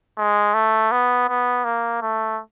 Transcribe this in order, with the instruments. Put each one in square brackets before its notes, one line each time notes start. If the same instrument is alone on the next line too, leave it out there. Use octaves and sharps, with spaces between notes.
[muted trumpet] G#3
A3
B3
B3
A#3
A3